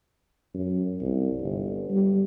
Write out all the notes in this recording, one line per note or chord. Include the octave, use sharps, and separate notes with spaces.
F#2
C2
G1
G3